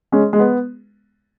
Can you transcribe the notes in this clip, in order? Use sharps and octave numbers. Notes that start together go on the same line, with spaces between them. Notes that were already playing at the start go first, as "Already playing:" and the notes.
G#3 C#4
G#3
B3